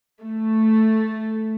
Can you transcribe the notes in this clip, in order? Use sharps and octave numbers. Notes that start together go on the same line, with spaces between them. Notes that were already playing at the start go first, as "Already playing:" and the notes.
A3